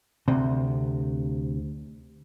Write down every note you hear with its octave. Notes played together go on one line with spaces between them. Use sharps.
D2 C3